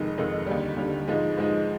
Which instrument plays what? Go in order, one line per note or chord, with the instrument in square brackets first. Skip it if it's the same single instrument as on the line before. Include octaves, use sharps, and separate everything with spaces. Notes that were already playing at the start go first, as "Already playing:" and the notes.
Already playing: [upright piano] F1 F2 D#3 G#3 D#4
F1 F2 D#3 G#3 D#4
D#2 D3 G3
D#2 D3 G3
G#2 F3 G#3 D#4
G#2 F3 G#3 D#4